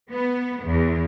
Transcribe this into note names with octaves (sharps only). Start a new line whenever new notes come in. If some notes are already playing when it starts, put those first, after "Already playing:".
B3
E2